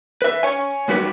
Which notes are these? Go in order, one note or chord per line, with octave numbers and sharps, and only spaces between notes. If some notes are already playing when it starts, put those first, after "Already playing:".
B4 E5
C#5 G#5
F#2 G3 F#4 B4